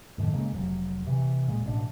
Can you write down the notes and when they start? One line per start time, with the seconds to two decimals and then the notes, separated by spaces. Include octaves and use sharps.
0.18 F#2 A2 D3 D#3
0.33 C#3 G#3 A#3
0.53 F1 A#2 F#3
1.07 C3 E3
1.47 F1 A#2 G#3
1.64 A1 B2 D4